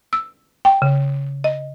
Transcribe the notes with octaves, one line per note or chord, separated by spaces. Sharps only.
E6
G5
C#3
D#5